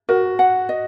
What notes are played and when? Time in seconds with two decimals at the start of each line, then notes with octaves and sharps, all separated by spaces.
0.09 F#4 A#4
0.39 F#5
0.69 D#5